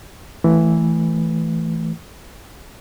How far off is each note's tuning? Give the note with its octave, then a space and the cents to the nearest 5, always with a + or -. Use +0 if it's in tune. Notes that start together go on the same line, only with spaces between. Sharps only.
E3 +0 A3 +5